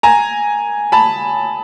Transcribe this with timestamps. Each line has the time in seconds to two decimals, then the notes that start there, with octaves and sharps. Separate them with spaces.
0.03 G#5 A#5
0.92 A5 B5